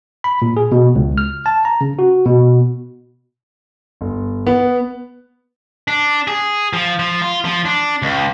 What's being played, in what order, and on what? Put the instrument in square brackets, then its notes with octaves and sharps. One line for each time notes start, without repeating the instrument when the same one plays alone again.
[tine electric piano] B5
A#2
G#4
B2
C#2
F6
A5
A#5
C#3
F#4
B2
[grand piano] G1
B3
[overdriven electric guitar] D4
G#4
F3
F3
F4
F3
D4
C#2